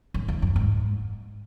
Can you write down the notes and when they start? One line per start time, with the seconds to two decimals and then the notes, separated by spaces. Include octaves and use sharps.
0.14 F#2
0.28 E2
0.42 F#2
0.56 G#2